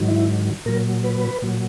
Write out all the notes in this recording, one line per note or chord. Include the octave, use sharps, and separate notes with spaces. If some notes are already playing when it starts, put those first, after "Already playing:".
Already playing: G#2 D#3 F#3
E4
A#2 F#3 A#4
B4
A#2 F#3